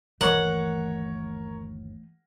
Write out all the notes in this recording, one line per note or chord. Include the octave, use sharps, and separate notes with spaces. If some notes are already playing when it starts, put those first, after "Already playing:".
G1 D#2 E3 A3 A#4 C#5 F#5 C#6